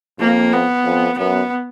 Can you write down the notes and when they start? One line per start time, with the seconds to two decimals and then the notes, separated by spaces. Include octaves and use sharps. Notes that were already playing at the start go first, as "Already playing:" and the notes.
0.19 F2 A#3
0.53 B3
0.85 F2
1.18 F#2 B3